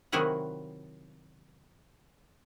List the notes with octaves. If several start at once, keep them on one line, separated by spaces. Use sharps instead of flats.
C3 D#3 F#3 E4 G#4 F#5